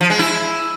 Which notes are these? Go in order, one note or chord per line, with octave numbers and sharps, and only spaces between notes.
F3
G#3
E4